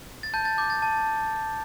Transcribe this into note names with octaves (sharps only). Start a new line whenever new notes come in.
A6
A5 G6
A6
D6 G6
A6
A5